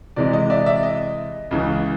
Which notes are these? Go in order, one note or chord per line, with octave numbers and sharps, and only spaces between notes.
C3 E3 G#3 D5
D#5
D5 E5
D5 E5
D#5
C#2 C#3 E3